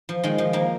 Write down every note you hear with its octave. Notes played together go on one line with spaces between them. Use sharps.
F3
D#3 G#3
F3
F3 A#3